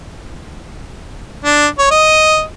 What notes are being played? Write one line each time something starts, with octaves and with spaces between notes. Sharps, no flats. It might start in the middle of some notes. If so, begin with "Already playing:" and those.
D4
C#5
D#5